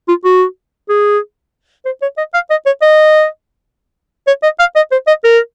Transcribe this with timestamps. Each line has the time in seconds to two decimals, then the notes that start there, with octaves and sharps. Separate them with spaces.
0.08 F4
0.25 F#4
0.89 G#4
1.86 C5
2.02 C#5
2.18 D#5
2.34 F5
2.50 D#5
2.66 C#5
2.82 D#5
4.27 C#5
4.43 D#5
4.60 F5
4.76 D#5
4.92 C5
5.08 D#5
5.24 A#4